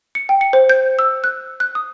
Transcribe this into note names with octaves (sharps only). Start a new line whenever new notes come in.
C#7
G5
C#7
C5
G6
E6
F#6
F#6
D#6